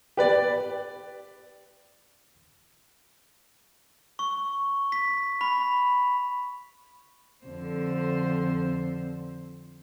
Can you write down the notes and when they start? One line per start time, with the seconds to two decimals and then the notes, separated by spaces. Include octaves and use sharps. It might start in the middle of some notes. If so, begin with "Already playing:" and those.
0.17 G4 B4 D5
4.19 C#6
4.92 B6
5.41 B5
7.45 F2 D3 C5